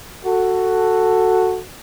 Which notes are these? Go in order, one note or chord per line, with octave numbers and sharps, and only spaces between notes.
F#4 A4